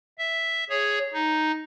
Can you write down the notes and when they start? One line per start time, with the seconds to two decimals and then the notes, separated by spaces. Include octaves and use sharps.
0.18 E5
0.70 G#4 C#5
1.14 D#4